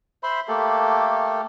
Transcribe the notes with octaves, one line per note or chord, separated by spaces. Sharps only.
C5 E5 B5 C6
A3 A#3 G4 A4